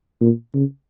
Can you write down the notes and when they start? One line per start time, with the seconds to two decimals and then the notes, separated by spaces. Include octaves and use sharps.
0.21 A#2
0.54 C#3